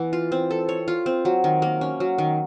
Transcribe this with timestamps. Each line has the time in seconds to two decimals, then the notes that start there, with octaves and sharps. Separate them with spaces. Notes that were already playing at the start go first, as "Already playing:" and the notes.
Already playing: E3 B3
0.13 F4
0.32 C4
0.51 A4
0.69 C#5
0.88 F4
1.06 C4
1.25 F#3
1.44 D#3
1.62 A#3
1.81 C#4
2.00 F#3
2.18 D#3